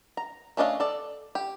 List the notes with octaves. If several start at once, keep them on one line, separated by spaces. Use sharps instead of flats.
A#5
A3 C#4 D4 D#5 F5
A4 D5
G4